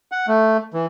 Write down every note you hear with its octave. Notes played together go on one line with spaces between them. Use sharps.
F#5
A3
E3